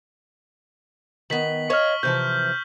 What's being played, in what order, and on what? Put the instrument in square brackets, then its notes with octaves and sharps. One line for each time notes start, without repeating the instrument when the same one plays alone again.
[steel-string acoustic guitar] D#3 B3 [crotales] B6 F#7
[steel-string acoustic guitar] C#5 D#5 F5 [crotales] C#6 F6
[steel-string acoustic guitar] C3 E3 F3 [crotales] G6